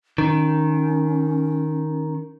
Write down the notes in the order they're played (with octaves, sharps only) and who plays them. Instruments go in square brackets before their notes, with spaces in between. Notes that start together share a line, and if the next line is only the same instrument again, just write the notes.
[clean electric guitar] D#3 [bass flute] C#4